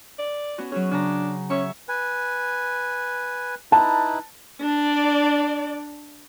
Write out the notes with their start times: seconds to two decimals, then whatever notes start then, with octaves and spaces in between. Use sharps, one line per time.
0.19 D5
0.58 B3 C#4 F#4
0.72 F#3 C#4 F#4 G#4
0.91 C#3 D4 A#5
1.50 C#4 C#5 E5 C#6
1.89 B4 G#5
3.72 D#4 E4 B4 A5
4.61 D4 D5